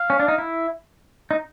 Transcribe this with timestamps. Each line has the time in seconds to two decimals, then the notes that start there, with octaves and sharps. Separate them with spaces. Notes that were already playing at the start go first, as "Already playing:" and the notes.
Already playing: F5
0.10 C#4
0.20 D4
0.28 D#4
0.38 E4
1.31 D#4